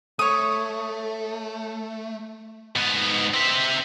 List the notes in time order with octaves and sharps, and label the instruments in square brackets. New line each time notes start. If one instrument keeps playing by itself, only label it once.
[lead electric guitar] A3 [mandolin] C#5 D#6
[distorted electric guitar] G#2 B3
C4 E5